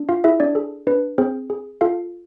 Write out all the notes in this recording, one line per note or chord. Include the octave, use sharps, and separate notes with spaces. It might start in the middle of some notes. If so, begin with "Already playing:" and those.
Already playing: D4
F4 F5
E4 G#4 E5
D4 D5
G#4 A4
D4 B4
C4 G#4 C5
G#4
F4 A4 F5